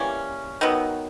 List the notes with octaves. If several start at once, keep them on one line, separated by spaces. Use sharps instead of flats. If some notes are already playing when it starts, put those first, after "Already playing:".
Already playing: E3 G3 A#3 C#4
D#3 F#3 B3